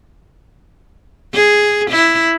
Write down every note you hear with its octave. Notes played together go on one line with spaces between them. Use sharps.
G#4
E4